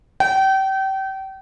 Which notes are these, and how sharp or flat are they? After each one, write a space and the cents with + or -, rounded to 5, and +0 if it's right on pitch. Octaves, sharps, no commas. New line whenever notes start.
G5 -30